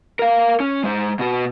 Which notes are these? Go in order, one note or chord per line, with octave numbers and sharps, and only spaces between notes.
A#4 F5
C#4
G#3 C5
B2 F#4